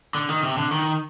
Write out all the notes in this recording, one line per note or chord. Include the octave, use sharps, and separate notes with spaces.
D3
D#3
C3
D3
D#3